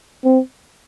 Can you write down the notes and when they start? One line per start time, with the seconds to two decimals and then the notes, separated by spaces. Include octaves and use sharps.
0.24 C4